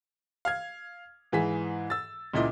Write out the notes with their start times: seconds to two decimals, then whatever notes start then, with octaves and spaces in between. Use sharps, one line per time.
0.45 F5 F6 G#6
1.32 G#2 E3 G#4 B6
1.90 E6 A6
2.34 C#2 A#2 E4 D#5 D6